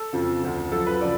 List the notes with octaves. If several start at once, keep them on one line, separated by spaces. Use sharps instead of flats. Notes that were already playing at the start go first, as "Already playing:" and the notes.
Already playing: A4
F2 C#3 F3
D2 D3 F3
F#2 F3 A4
B4
C#3 F3 D5